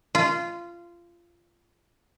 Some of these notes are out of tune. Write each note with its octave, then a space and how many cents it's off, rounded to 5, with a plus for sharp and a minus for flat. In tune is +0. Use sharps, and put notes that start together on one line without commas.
F4 -20